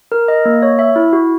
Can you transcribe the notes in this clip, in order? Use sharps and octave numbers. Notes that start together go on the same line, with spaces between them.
A#4
D#5
A#3
C#5
E5
E4
F#4